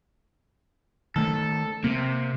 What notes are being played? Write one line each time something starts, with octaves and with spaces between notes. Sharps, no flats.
D#3 A3 A4
C3 A#3